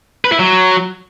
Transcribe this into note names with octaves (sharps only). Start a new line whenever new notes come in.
B4
E4
F#3